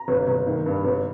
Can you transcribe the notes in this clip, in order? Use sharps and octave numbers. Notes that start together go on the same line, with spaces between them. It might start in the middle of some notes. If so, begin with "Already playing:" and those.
Already playing: A#5
G1
G1
D#3
G2
G1